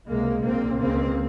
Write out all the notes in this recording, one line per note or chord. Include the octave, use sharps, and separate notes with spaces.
C#2 C3 G#3 A#3
A#1 A#2 A#3 C4
C#2 C#3 A#3 C4